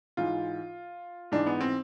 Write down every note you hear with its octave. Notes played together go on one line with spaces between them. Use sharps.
G#2 E3 F4
G#2 E3 D4
B3
C4